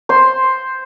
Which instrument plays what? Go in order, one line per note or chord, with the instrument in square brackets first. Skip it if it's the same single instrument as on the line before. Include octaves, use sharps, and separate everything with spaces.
[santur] C5 C6